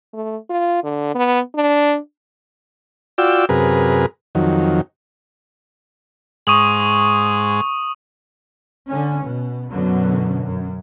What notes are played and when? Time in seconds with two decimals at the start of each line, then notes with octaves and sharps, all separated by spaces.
0.14 A3
0.50 F4
0.84 D3
1.15 B3
1.55 D4
3.18 F4 F#4 D5 G5 E6
3.49 F#2 C3 G#4 A#4 B4
4.35 F2 D#3 F#3
6.47 G#2 C#6 D#6 F#7
8.87 D3 C#4
9.22 B2
9.70 F#2 B2 D3 F#3
10.43 F#2